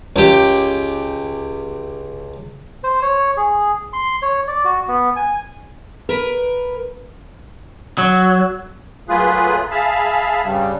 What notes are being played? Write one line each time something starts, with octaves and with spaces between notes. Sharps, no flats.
C#2 G4
C5
C#5
G#4
C6
C#5
D5
F#4
B3
G#5
A#4 B4
F#3
F#3 A3 A#3 F4 G#4 B4
G#4 E5 F5 A5 B5
G2 C#3 G3